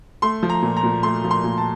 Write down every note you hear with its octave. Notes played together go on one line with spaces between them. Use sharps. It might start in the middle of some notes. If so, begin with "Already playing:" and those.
A3 C6
F3
A#5
A#2
A#5
A#2
A3 C6
F3
C6
A#2
A5